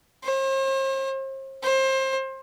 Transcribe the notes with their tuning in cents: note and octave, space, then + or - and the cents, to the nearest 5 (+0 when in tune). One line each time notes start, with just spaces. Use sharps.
C5 +40
C5 +25